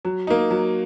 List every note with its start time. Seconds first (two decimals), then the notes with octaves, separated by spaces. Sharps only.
0.05 F#3
0.27 A#3 D#4
0.51 F#3